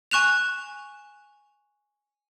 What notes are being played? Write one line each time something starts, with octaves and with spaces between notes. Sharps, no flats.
G#5 C#6 F#6 E7 F7